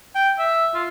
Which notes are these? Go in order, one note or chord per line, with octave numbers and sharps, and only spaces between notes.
G5
E5
F4